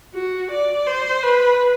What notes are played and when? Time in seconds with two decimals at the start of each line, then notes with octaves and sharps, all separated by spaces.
0.14 F#4
0.51 D5
0.87 C5
1.23 B4